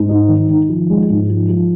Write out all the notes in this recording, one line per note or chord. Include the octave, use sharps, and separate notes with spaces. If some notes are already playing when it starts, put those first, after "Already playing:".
Already playing: G#2
D#4
D#3
D#3
F3
G#3
G#2
F3
F3